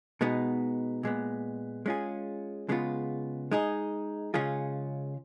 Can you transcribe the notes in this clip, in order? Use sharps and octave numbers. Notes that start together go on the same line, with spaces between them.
B2 G#3 B3 D#4
A#2 G#3 B3
G#3 C#4 F4 G#4
C#3 G#3 B3 F4
G#3 D#4 G#4
C#3 G#3 C#4 F4 G#4